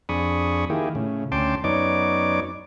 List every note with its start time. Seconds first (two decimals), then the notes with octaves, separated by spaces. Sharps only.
0.09 F2 D4 G#4 B5 C#6 D#6
0.70 D#3 A#3 E4 G4 G#4
0.95 A2 C#3
1.32 D2 C#4 G5 A5 C6 D6
1.64 F#2 B3 D#4 C#5 D5 D6